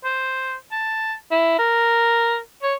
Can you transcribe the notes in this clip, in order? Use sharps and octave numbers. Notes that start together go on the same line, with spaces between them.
C5
A5
E4
A#4
C#5